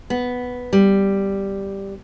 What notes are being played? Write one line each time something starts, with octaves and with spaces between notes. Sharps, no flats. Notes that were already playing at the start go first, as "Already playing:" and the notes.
B3
G3